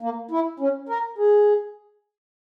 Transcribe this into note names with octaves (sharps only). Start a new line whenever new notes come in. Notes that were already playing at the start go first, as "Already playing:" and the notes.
A#3
E4
C#4
A#4
G#4